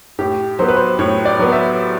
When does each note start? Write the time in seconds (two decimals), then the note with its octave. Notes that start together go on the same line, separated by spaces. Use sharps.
0.19 A2 G4
0.59 F#3 B3 C5
0.68 B4
0.77 C5
0.99 A2 C#5
1.25 D5
1.39 F#3 B3
1.52 E5